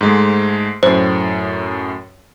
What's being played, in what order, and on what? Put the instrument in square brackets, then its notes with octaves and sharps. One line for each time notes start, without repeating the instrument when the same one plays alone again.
[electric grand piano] G#2 G#3 A3
[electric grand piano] F#2 A2 [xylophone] C5